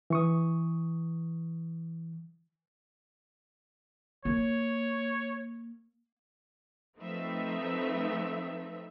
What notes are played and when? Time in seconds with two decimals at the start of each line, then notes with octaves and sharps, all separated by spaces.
0.10 E3 C#6 D#6
4.25 A#3 C#5
6.98 F3 A3 C4 D#4 B4 E5